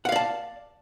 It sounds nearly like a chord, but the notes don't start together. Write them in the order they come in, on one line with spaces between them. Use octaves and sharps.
F#5 F5 D5 A5